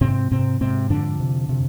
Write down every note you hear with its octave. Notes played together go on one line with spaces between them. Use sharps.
G#2 C3 C4
G#2 C3 C4
G#2 C3 C4
F2 D3 D4
C3
C3